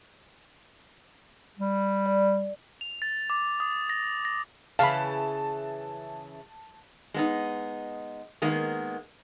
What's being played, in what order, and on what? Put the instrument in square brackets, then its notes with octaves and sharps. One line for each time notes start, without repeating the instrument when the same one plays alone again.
[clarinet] G3
[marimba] D5
[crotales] F7
A6
D6
D#6
A#6
A#6
[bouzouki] C#3 E3 [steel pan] F5 B5 [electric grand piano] A5
[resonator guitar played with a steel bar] G#3 B3 D#4
D#3 G#3 A#3 B3